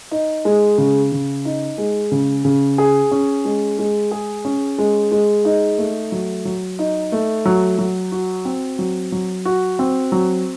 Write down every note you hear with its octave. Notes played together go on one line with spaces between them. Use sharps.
D#4
G#3
C#3
C#3
D#4
G#3
C#3
C#3
G#4
C#4
G#3
G#3
G#4
C#4
G#3
G#3
D#4
A3
F#3
F#3
D#4
A3
F#3
F#3
F#4
C4
F#3
F#3
F#4
C4
F#3